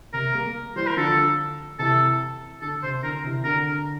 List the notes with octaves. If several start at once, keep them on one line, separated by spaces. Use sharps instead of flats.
C3 A#4
G3 A#3
E3 G3 C5
A#4
D3 F3 A4
C3 E3 A4
D3 A4
C3 C5
D3 A#4
C3 E3
D3 A#4